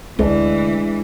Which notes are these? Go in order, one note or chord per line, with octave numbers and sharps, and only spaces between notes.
D2 E3 G#3 A#3 D4